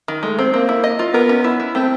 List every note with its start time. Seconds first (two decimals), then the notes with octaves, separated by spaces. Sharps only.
0.08 D#3
0.23 G#3 A3
0.39 C4
0.54 A#3 C4
0.69 E4
0.84 D#5
0.99 F4
1.14 B3 A#4
1.29 C#4
1.44 E4
1.60 E4
1.75 A3 C4